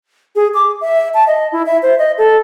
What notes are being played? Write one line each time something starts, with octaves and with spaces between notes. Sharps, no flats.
G#4
D6
E5
A5
D#5
E4
E5
C5
D#5
A4